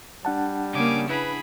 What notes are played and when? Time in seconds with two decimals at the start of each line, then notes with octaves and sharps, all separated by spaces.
0.25 G3 D4 F#5 A5
0.73 C#3 A#3 G#5 D6
1.09 E4 G#4 B4 B5